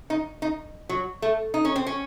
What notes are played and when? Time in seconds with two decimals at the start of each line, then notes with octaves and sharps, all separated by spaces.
0.10 D#4
0.42 D#4
0.89 F#3
1.22 A3
1.54 D#4
1.65 C#4
1.76 C4
1.87 C#4